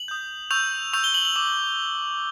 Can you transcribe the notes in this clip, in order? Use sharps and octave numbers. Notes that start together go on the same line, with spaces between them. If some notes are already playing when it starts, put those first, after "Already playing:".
Already playing: F#7
D#6 G6
C#6 E6 G6 F7
C#6 E6 G6 F7
G7
F#7
F#7
D6 F#7